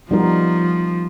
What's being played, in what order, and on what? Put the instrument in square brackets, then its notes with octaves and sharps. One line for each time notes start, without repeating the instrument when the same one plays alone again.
[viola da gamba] F3 [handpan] G3 B3 D#4 F#4 A#4